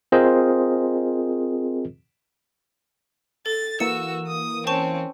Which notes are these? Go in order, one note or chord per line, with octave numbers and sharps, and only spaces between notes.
C4 F4 G#4 A#4 C5 D#5
A4 A6
E3 A#3 F#4 E6 C#7
D#6
C4 C#4 C5 A5 C#6